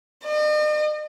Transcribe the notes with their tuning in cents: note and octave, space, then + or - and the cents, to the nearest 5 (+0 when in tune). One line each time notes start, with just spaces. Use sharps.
D#5 -45